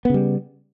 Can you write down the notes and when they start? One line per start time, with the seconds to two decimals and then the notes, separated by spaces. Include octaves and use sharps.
0.05 B3
0.10 C#3
0.14 G3